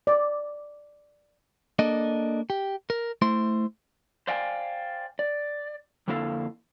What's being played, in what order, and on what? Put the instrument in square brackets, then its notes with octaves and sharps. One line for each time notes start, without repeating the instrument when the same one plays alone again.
[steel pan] D5
[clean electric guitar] A#3 D4 A4 D#5
G4
A#4
A3 E4 C5 C6
[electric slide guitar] C5 D5 F5 G5 G#5
D5
F2 D3 A#3 E4 A4 F5